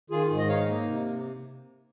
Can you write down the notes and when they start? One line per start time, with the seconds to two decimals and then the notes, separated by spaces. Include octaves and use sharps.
0.10 D#3 F4 G#4
0.30 G#2
0.39 D#5
0.48 D#4 C#5 F5
0.68 A#3
0.87 C3